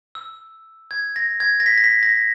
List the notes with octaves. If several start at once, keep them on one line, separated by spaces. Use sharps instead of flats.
E6
G#6
A#6
G#6
A#6
B6
A#6
B6
A#6